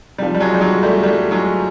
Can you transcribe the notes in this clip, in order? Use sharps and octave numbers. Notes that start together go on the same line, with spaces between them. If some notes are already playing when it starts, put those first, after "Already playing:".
C3 F3 G3
G3
F#3 G#3
G3
F#3 G#3
G3 A3
G3 A3
F#3 G#3